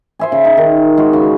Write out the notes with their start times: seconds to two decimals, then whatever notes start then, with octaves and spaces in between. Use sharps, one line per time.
0.19 C5 E5 G#5
0.32 C#3
0.45 D#4
0.57 D#3
0.97 G#3 F#4
1.13 C#3